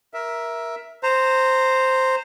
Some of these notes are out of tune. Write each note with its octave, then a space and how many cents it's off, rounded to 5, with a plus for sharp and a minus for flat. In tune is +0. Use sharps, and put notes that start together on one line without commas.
A#4 +15 E5 +0
C5 +0 A#5 -20